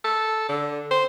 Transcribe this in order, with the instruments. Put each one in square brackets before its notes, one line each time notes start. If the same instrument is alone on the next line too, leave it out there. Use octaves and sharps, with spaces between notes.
[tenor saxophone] A4
D3
C5